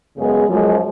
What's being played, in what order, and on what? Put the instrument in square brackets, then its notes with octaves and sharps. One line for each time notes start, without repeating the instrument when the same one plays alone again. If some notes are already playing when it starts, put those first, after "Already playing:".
[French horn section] F#2 C#3 G#3 B3 G#4
F#2 F3 G#3